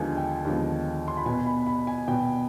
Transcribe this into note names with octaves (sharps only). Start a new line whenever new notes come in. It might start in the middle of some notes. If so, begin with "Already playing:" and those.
Already playing: D#2 D3 F3 G#3 B3 G#5
G5
D#2 D3 F3 G#3 B3
C6
B5
B2 B3 G#5
B5
B5
G#5
B2 B3 G5